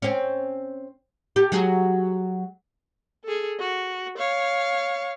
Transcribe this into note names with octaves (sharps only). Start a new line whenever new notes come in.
C4 C#4
G4 A4
F#3 F#4 G#4
G#4 A4
F#4
C#5 F5